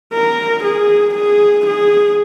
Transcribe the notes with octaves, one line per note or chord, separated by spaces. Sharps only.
A#4
G#4
G#4
G#4